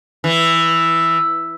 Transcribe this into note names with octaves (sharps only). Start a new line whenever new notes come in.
E3